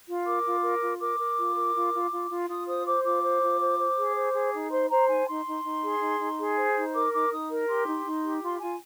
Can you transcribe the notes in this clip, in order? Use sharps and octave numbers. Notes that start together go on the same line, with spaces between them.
F4
A#4 D6
F4
A#4
F4
A#4 D6
A#4
F4
A#4
F4
F4
F4
F4
F4 D#6
C5 D#6
C5 D6
F4 D6
C5
F4
C5
C5
G#4
C5
G#4
D#4
C5 C6
C5 A#5
D#4 G#5
D#4 C6
D#4
D#4
G#4
D#4
D#4
G#4
C5
D#4
A#4 D6
D#4 D6
D#4 D#6
A#4
G4 C6
D#4
D#4
G4
F4 C6
F4 G#5